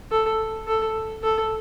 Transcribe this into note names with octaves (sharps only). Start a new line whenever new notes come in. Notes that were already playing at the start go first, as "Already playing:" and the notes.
A4
A4
A4